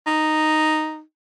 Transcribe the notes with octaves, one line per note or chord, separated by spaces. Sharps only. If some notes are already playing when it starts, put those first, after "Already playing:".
D#4